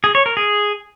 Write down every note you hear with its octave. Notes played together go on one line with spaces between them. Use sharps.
G#4
C#5
A#4
G#4